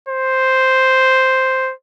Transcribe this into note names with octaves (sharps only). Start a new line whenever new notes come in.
C5